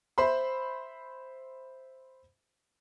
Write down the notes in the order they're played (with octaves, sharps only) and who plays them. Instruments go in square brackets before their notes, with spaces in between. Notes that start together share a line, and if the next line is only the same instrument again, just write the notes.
[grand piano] C5 E5 B5 C6